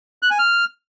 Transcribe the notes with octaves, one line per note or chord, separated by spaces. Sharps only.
F#6
G#5
F6